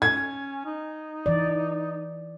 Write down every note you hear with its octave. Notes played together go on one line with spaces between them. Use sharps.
C#4 G#6
D#4
E3 D5